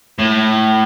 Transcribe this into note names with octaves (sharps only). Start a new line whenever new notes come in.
A2